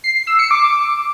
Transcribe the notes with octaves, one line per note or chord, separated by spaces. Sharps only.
C7
C7
E6
C#7
D6